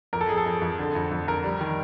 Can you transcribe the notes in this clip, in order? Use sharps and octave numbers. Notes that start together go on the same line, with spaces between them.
F2 A#4
A4
F2 G#4
A4
F2
F2
D3
F2
F2
F2 A#4
G3
D#3